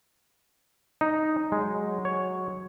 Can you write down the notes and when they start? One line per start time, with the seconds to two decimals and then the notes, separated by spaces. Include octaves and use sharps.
1.01 D#4
1.52 F#3 G#3
2.05 C#5